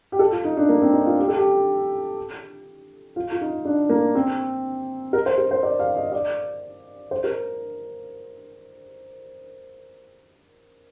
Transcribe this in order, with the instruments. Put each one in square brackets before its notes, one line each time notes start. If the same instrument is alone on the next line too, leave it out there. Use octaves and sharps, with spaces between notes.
[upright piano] G4
A4
F4
D#4
D4
A#3
C4
D#4
F4
G4
A4
G4
F4
F4
D#4
D4
A#3
C4
A#4
C5
A#4
C5
D5
F5
D#5
D5
C5
A#4